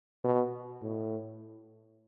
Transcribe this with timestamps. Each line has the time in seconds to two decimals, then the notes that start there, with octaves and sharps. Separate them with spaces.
0.24 B2
0.82 A2